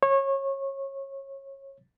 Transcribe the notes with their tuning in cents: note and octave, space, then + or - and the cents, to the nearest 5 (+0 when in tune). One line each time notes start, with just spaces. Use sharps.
C#5 -25